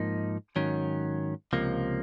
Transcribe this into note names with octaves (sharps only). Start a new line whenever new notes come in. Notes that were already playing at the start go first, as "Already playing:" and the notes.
Already playing: G#2 F3 A#3 D#4
G#2 D#3 F#3 C#4
C#2 C3 F3 A#3